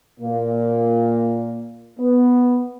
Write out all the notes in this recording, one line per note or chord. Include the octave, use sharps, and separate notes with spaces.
A#2 A#3
B3